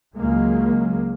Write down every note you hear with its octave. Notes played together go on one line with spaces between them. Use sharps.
C#2 F#3 G#3 A#3